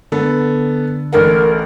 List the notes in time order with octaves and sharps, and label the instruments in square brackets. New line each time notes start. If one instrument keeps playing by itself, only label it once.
[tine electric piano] D3 [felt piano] B3 A4
[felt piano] A1 A4 F#5 [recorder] A#4